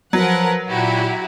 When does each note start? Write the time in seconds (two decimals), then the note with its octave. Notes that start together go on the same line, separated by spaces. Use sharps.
0.13 F3 F#3 A#4 B4 F#5
0.68 A#2 E4 F#4 G4